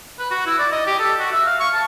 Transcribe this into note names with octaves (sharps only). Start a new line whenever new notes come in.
B4
F#4
E4
D5
D#5
G4
A4
F#4
E5
F5
C#6
A5